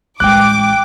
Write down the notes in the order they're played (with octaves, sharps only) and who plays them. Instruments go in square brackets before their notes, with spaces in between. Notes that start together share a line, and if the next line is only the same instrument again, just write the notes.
[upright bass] A1 G#3 [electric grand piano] G5 F#6 [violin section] D6